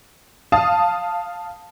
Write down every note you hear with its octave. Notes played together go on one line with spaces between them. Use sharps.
F5 A5 D#6